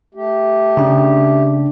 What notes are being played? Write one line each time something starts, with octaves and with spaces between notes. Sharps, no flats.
A3 G4
C#3 D4